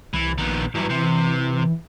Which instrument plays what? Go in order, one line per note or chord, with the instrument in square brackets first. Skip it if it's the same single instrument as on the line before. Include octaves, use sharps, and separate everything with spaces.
[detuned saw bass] C2 [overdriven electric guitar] E3
[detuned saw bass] A#1 [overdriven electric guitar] D#3 B3
[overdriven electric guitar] G2 F#3 [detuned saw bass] E3
[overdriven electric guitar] C3